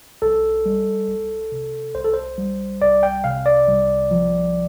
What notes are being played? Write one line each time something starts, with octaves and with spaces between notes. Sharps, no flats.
C2 A4
G3
C2
C3
C2 C5
A4
C5
G3
C2 D5
G5
C3 F5
D5
C2
F3